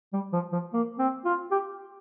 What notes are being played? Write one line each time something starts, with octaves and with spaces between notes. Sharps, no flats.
G3
F3
F3
A#3
C4
F4
G4